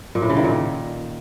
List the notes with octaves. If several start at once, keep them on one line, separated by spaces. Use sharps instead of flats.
A#2
A2
C#3
D#3
A#2